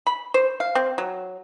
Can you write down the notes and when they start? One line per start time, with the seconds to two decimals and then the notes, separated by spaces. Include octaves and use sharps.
0.07 B5
0.34 C5
0.60 F5
0.75 C4
0.98 F#3